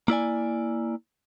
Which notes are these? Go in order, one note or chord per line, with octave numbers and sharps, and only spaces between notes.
A#3 E4 D5 G#5